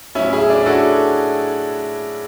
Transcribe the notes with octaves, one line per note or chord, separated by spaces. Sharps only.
A2 F#3 C#4 E4
E4 G#4
D4
F#4 A4